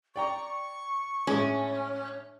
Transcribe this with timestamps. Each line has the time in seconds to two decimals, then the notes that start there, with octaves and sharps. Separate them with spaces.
0.16 D5 G5 A#5 C#6
1.27 A2 G#3 C#4